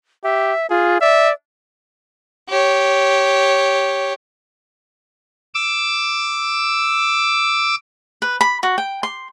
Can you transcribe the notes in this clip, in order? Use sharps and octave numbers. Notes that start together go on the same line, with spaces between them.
G4 E5
F4 G#4
D5 E5
G4 C#5
D6 E6
B4
B5
F#4
G5
C6